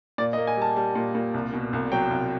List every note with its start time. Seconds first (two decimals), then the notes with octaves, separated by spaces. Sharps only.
0.18 A#2 D5
0.33 D#5
0.38 A#3
0.47 G#5
0.57 G3 A5
0.76 G3 A5
0.95 A#2
1.15 A#2
1.34 C2
1.53 B2
1.73 C2
1.92 F#3 G5
2.11 C2